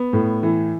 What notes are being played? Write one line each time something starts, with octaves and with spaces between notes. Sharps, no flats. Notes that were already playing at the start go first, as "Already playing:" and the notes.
Already playing: B3
A2
E3